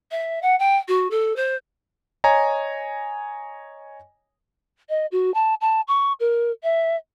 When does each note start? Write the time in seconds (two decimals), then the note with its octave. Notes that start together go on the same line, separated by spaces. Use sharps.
0.11 E5
0.42 F#5
0.59 G5
0.88 F#4
1.11 A4
1.36 C5
2.24 C#5 D#5 G#5 A#5
4.89 D#5
5.12 F#4
5.34 A5
5.61 A5
5.88 C#6
6.20 A#4
6.63 E5